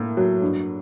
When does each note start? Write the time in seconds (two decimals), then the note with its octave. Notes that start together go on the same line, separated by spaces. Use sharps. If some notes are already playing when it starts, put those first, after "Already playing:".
Already playing: A2 A#3
0.17 F#3
0.42 G2